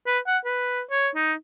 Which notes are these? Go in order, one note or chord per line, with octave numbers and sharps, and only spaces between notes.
B4
F#5
B4
C#5
D#4